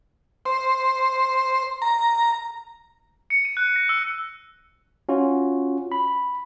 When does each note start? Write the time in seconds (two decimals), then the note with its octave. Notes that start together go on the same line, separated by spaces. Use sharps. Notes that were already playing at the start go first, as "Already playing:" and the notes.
0.46 C5
1.82 A#5
3.30 C#7
3.45 D#7
3.57 F#6
3.76 A#6
3.89 E6
5.09 C#4 F4 F#4
5.92 B5